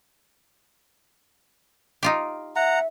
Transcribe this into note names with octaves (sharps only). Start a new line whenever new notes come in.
D#4 F4 G4
E5 F#5 A#5